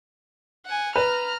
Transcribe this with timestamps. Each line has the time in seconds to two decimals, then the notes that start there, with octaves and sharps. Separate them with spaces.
0.66 F#5 G#5
0.96 B4 A#5 F6